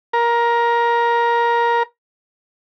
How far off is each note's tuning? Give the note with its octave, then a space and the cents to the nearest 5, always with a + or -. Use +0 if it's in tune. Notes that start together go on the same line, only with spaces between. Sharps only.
A#4 +15